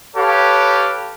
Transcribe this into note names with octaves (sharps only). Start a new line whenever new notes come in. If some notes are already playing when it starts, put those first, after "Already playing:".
G4 A4 B4 C#5 F5